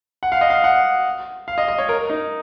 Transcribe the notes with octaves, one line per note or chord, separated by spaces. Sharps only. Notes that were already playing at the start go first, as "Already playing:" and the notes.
F#5
F5
D#5
F5
F#5
F5
D#5
D#5
C#5
A#4
D#4